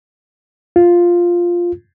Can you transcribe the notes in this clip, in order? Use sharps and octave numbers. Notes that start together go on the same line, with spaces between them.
F4